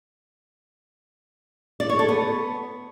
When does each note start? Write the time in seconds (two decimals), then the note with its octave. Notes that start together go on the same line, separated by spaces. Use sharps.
1.80 D5
1.89 C#5
1.99 A4
2.09 B3